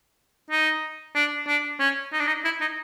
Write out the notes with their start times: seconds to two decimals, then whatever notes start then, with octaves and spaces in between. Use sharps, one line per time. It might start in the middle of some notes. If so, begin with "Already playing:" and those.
0.50 D#4
1.15 D4
1.47 D4
1.79 C#4
2.12 D#4
2.19 D4
2.27 D#4
2.45 E4
2.61 D#4